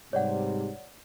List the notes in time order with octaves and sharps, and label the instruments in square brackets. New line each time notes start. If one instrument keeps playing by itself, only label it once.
[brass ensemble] G#2 C3 G3 [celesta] C#5 D5 F#5